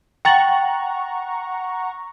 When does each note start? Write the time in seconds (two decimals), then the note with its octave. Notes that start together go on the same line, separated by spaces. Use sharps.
0.25 F#5 G5 A#5 C#6 A6 F#7